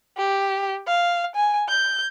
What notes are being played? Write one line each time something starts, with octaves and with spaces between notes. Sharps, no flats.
G4
F5
G#5
G6